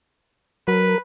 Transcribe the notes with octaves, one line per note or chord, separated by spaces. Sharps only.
F#3 A#4 B4